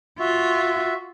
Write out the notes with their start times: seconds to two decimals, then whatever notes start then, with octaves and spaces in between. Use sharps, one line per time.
0.19 F4 F#4 E5